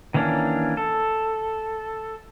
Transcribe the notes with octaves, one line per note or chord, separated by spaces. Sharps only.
D#3 E3 A#3 C#4 D4
A4